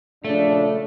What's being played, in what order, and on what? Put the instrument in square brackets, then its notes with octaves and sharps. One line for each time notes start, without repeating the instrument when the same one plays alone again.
[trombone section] A#1 C#3 D4 [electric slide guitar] A3